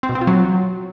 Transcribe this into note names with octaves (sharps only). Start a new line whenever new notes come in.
C4
B2
C4
F4
F#3